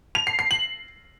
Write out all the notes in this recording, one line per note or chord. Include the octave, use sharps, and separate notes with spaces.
F7
C7
C7
F#7